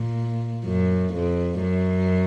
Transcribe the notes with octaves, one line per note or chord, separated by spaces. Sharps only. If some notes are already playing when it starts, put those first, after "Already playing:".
Already playing: A#2
F#2
F2
F#2